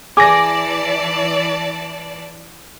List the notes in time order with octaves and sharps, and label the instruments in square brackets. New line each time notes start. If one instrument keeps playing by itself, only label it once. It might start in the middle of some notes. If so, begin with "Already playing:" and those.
[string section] E3 D5 A5 [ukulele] G#4 [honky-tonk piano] D6 A#6